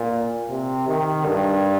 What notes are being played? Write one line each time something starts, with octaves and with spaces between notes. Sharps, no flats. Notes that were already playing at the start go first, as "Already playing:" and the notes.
Already playing: A#2
C3
D#3
G2